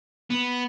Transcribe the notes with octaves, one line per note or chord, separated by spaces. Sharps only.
B3